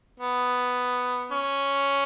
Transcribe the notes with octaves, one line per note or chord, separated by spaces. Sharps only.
B3
C#4